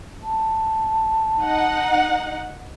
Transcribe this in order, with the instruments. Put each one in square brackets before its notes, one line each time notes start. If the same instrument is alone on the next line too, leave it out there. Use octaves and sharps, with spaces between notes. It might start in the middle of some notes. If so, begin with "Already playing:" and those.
[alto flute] A5
[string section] D#4 F#5